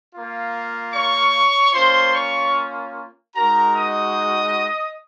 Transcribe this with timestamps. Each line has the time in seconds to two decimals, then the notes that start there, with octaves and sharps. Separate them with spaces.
0.13 A#3 F4
0.94 C#5 C#6
1.74 A#3 C#4 F4 C5 C6
2.15 C#5 C#6
3.35 G#3 D#4 F#4 A#4 A#5
3.76 D#5 D#6